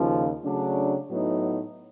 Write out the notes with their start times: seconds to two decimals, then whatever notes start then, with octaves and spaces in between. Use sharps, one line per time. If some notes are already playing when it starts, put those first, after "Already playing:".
Already playing: D#2 C#3 F3
0.42 C#3 F#3 A3 D4
1.08 A2 F#3 B3 D#4